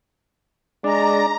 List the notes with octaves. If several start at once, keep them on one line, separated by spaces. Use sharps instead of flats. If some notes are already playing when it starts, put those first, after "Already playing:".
G#3 D4 D5 A#5